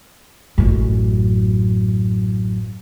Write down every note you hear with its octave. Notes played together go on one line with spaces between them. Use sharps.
A1 F#2